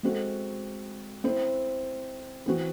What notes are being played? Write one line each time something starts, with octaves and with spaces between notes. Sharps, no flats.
G#3 C4 F#4 A4
C4 E4 C5
E3 C4 F#4